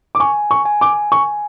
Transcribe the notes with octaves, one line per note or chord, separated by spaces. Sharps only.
D6
G#5 C#6
C#6
G#5
D6
G#5 C#6